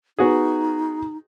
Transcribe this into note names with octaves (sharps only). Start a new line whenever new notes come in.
B3 D#4 F#4 G#4